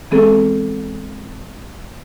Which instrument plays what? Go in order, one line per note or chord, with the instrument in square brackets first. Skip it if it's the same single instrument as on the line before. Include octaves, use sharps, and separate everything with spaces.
[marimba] E3 G#3 B3 C4 G#4 A4